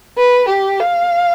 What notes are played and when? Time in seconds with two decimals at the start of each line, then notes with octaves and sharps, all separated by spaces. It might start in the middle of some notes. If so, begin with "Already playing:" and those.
0.18 B4
0.49 G4
0.80 F5